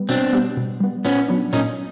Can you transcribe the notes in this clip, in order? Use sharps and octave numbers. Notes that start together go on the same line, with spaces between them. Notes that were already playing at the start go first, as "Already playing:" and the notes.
Already playing: G3 B3
B2 C4 D4
G3 B3
B2
G3 B3
A#2 B3 C#4
F#3 B3 D4
A#2 C#4 D#4